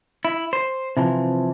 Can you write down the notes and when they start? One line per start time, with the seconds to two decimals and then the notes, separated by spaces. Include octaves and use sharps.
0.25 E4
0.53 C5
0.97 C3 E3 F3